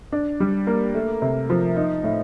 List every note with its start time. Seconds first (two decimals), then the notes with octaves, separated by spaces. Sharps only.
0.12 D4
0.40 G3
0.67 A#3
0.95 A3
1.22 C3
1.50 F3
1.77 D#4
2.04 A2